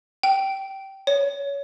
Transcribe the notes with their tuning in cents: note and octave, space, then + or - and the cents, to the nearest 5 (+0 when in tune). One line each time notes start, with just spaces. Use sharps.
G5 -15
C#5 +20